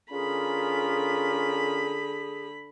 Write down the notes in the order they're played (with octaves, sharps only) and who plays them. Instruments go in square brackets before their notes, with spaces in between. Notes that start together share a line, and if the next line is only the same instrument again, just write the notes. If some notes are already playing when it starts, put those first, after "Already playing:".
[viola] D3 B5 [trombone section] C#4 F4 A#4 [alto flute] G#4